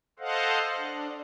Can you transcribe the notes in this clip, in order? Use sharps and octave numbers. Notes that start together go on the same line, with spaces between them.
A4 C5 D#5 F5 F#5
D4